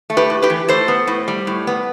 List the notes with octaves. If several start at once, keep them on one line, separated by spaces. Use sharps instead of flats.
A3
G4 B4
A2
G4 B4
E3
A2 A4 C5
B3
A2
G3
A2
B3